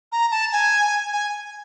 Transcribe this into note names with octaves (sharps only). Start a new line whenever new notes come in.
A#5
A5
G#5
G#5